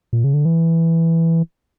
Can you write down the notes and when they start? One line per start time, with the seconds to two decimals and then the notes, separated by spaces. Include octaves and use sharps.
0.13 A#2
0.24 C#3
0.34 D3
0.45 E3